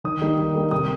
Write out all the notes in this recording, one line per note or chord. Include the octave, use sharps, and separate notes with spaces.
D#3 D#6
G3 A#3 D#4
D#3
G3 A#3 D#4
C3 D#6